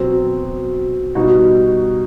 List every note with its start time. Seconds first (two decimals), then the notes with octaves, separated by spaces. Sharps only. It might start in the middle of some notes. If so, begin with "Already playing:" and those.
Already playing: B2 F#3 C4
1.15 B2 G3 D#4 F#4